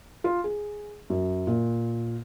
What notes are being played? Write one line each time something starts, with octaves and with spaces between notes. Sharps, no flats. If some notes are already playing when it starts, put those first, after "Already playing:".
F4
G#4
F#2
A#2